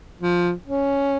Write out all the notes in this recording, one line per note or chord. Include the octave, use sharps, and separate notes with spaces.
F3
C#4